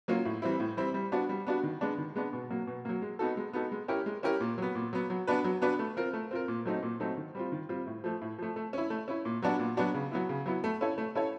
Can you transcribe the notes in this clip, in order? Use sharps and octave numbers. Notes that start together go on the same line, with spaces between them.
F#3 A#3 C#4 F4
A2
E3 G3 C4 E4
A2
E3 G3 C4 E4
G3
B3 D4 F#4
G3
B3 D4 F#4
D#3
G#3 B3 D4
D#3
G#3 B3 D4
B2
F#3 A#3
B2
F#3 A#3
G#3
B3 D#4 F#4 A4
G#3
B3 D#4 F#4 A4
G#3
C#4 E4 G4 A#4
G#3
C#4 E4 G4 A#4
A#2
F#3 B3
A#2
F#3 B3
F#3
B3 D4 F#4 B4
F#3
B3 D4 F#4 B4
A3
C4 F4 A#4
A3
C4 F4 A#4
A#2
F#3 A3 C4 D#4
A#2
F#3 A3 C4 D#4
D#3
G3 C4 F4
D#3
G3 C4 F4
A2
F3 A3
A2
F3 A3
A3
C#4 E4
A3
C#4 E4
A#2
F#3 B3 D4 F#4
A#2
F#3 B3 D4 F#4
C#3
F#3 B3 E4
C#3
F#3 B3 E4
A3
C#4 E4 A4 C#5
A3
C#4 E4 A4 C#5